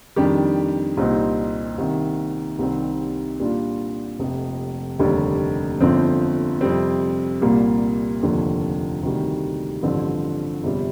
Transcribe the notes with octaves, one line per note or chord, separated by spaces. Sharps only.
F2 D#3 G3 D4 G4
C2 A#2 G3 C4 D#4
C2 C3 D#3
C2 C3 D#3 G3 C4
A#2 G3 D4 F4
F1 F2 C3
F1 D#2 D3 G3
G1 F2 D3 F3 C4
F2 C3 G3 C4
C2 A#2 G3 A#3
F1 D#2 D3 F3
D2 C3 D#3 G3
A1 G2 D3 F3 C4
G1 F2 C3 G3